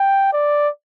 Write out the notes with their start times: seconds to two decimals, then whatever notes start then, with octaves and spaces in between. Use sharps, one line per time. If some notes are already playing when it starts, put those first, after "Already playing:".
Already playing: G5
0.33 D5